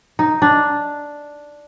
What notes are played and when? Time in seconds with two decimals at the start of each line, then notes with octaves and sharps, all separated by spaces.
0.19 D#4
0.42 D4